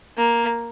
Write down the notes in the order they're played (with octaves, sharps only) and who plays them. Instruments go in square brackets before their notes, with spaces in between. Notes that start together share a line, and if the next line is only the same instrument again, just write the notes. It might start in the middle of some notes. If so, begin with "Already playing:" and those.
[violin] A#3